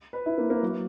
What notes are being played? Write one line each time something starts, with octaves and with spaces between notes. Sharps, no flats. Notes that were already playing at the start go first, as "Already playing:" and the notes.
B4
E4
A#3
A#3
F#3